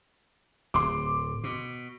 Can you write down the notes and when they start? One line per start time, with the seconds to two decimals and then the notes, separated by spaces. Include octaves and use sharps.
0.74 D1 C6 D6
1.44 B2